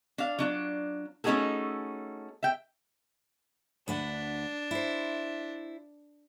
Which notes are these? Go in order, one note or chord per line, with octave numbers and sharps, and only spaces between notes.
D4 F5
F#3 D4 F4
A3 C#4 D#4 F#4 G#4 A4
E5 G5
D2 D4 B4 F#5
E4 C5